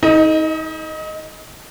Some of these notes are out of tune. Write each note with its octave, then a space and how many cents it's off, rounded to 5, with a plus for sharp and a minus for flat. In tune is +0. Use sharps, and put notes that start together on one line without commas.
D#4 +35 A4 -40 D#5 +0